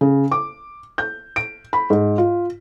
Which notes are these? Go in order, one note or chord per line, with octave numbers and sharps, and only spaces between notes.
C#3
D6
G6
D7
B5
G#2
F4